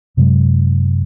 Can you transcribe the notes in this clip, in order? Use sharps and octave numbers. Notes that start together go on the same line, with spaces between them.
F#2 C3 F#3 G#3